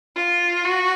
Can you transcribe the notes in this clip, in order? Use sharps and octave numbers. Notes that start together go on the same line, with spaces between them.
F4
F#4